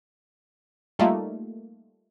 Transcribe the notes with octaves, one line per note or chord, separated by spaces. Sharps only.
G3 A3 A#3 D#4 F4